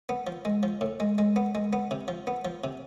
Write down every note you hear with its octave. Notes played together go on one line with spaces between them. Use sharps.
B3
F3
G#3
F3
A2
G#3
G#3
B3
G#3
B3
C3
F3
B3
F3
C3